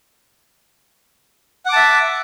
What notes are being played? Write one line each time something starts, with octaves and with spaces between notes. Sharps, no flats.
E5 F#5 A5 D6